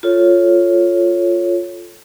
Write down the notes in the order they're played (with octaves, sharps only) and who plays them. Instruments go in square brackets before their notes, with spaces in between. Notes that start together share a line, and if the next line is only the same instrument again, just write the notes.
[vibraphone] F4 A4 C#5